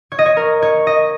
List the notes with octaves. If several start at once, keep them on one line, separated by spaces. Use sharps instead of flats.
C#5
D#5
C#5
A#4
C#5
D#5